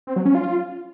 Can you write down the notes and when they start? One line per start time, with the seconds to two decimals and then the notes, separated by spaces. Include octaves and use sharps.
0.07 C4
0.16 F#3
0.26 C#4
0.35 F4